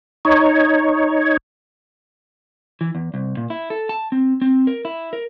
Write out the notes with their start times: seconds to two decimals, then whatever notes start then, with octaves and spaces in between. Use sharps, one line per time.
0.25 D#4 C#5
2.81 E3
2.95 E2
3.14 C2
3.37 A#2
3.50 E4
3.70 A4
3.89 A5
4.12 C4
4.42 C4
4.67 A#4
4.85 E4
5.13 A#4